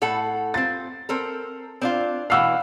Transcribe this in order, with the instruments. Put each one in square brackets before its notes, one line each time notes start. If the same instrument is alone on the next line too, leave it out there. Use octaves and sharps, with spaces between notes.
[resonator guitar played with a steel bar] A2 A4 F#5
[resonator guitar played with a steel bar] C4 F4 [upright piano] A6
[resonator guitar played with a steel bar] C4 A4 A#4
C4 D4 F4
[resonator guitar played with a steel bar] B2 E3 [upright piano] F5 F#5 E6